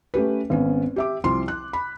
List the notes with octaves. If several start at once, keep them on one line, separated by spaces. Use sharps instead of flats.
A3 C#4 G4 B4
G#1 B3 C#4
G4 E5 D6
C2 F3 F4 C6
F#6
B5